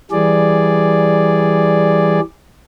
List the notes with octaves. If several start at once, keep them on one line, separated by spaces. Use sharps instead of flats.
E3 G3 G#4 D5